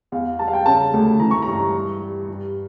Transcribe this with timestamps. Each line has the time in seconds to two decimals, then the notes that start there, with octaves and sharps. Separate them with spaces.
0.12 E2 F5
0.39 G3 A5
0.48 F5
0.53 G5
0.66 C#3 A5
0.93 D2
1.20 E3 A#5
1.31 C#6
1.42 G2 A#5
1.75 G3
2.02 G3
2.28 G2